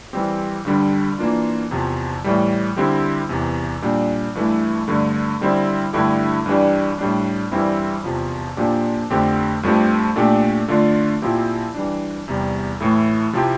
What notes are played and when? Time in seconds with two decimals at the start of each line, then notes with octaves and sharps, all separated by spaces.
0.13 E3 G3 C4 G4
0.65 G2 D3 G3 D4 G4
1.18 E3 A#3 D4 F4
1.71 E2 C3 F3
2.24 A2 E3 G3
2.77 D3 G3 C4 E4 G4
3.29 E2 C3 E3
3.82 A#2 G3 D4
4.35 G2 E3 A3 E4
4.88 G2 D3 A3
5.41 D3 G3 C4 E4
5.93 G2 D3 A3 E4 G4
6.46 G2 E3 G3 D4 G4
6.99 A2 G3 D4
7.52 G2 E3 G3 C4 E4
8.04 E2 C3 F3
8.57 A#2 F3 A#3 D4 G4
9.10 F2 D3 A3 C4 G4
9.63 G2 F3 A3 C4 G4
10.16 A#2 A3 D4 G4
10.68 D3 A3 D4 F4
11.22 A#2 F3 C4 E4 G4
11.74 E3 G3 D4
12.28 E2 C3 G3
12.80 A2 E3 A3 E4
13.33 C3 F3 C4 E4 G4